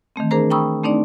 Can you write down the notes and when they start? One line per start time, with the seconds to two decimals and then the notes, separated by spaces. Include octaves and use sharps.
0.16 D#3 E3 A3 C4
0.31 D4 G#4 A#4 C5 A#5
0.50 G5 A#5 B5 C#6 D#6 E6
0.83 A3 C4 D4 D#4 D5